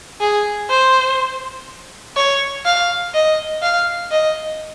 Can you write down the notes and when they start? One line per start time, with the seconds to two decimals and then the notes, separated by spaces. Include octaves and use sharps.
0.21 G#4
0.70 C5
2.16 C#5
2.65 F5
3.14 D#5
3.63 F5
4.11 D#5